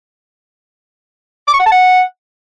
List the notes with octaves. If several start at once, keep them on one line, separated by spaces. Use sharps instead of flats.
D6
C#6
F#5
A5
F#5